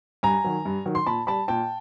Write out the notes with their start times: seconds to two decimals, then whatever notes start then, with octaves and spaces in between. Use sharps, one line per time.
0.23 G2 G#5 A#5
0.44 D#3 F#3
0.65 G2
0.86 D#3 F#3
0.95 C6
1.06 A#2 A5 B5
1.27 G3 A5 B5
1.48 A#2 G5 A5